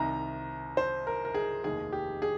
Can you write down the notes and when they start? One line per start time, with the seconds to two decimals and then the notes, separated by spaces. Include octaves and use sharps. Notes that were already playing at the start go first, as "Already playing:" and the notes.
Already playing: C2 C3 D#3 A#5
0.77 C5
1.07 A#4
1.25 A#4
1.34 G#4
1.64 F1 D#2 D#3 G#4
1.92 G4
2.22 G#4